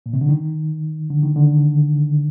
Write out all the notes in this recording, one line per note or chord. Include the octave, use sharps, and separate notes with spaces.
A#2
C3
D3
D#3
D3
D#3
D3